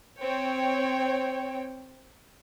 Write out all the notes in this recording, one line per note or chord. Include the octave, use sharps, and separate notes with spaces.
C4 C#5 G5